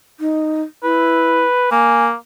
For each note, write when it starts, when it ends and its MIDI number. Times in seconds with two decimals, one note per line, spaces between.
0.20 0.62 63
0.83 1.41 64
0.83 1.70 71
1.71 2.14 58
1.71 2.04 80